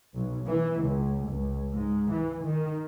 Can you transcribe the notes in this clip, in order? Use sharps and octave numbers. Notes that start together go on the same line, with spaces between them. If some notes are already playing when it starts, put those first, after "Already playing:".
B1
E3
C#2
C#2
G#2
E3
D#3